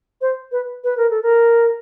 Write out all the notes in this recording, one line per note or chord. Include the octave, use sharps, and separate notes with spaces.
C5
B4
B4
A#4
A4
A#4